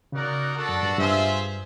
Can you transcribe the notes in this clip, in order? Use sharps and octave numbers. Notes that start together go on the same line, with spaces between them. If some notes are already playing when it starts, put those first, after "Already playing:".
C#3 D#4 F#4 A#4 D5 F#5
D4 F#4 A4 D5 F#5
F#2
G2
G2 F4 G#4 C5 E5